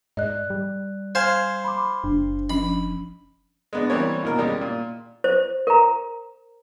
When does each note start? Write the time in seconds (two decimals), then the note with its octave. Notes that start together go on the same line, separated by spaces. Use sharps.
0.17 G#2 D5 D#5 F#6
0.50 G3
1.15 C5 F5 G#5 G#6 E7
1.64 B5 C6 D6
2.04 F#1 D4
2.50 F3 C#4 B5
3.73 G#3 B3 D4
3.90 E3 G3 A#3 C4 G4 C#5
4.23 D#2 B2 A#4
4.38 D#3 G3 G#3 C#4
4.61 A#2
5.24 C5
5.67 A#4 A#5